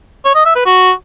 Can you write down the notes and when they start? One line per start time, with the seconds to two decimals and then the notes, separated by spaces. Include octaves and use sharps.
0.25 C#5
0.35 D#5
0.45 E5
0.56 B4
0.66 F#4